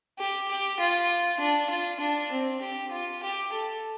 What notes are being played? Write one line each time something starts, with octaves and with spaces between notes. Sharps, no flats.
G4
G4
F4
D4
F4
D4
C4
G4
F4
G4
A4